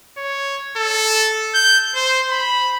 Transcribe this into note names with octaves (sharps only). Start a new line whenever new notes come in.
C#5
A4
G6
C5
B5